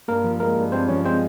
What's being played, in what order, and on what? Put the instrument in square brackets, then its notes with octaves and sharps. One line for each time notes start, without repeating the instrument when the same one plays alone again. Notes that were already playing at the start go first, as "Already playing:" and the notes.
[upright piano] G2 [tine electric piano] A#3 A#4
[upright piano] F3
[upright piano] G#3 [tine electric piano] A#3 A#4
[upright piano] G2
[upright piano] G2 [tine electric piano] C4 C5
[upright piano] F3 [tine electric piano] C#4 C#5
[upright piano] G#3 [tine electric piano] C4 C5